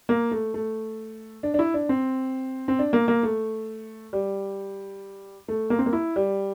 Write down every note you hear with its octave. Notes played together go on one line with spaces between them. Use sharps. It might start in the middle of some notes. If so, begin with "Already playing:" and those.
A#3
A3
A3
D4
D4
E4
D4
C4
C4
D4
A#3
A#3
A3
G3
A3
A#3
C4
A#3
E4
G3